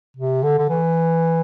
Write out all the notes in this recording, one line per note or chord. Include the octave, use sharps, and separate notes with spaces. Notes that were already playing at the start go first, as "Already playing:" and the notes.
C3
D3
D3
E3